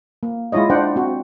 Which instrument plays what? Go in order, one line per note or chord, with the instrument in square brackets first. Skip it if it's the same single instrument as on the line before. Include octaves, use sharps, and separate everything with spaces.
[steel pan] A#3
G#3 E4 F4 C#5 D#5
D4 C5 D5 F#5 G5
C4 F#4